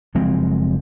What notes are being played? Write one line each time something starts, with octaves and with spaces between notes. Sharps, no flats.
F#1 F3 G#3 C4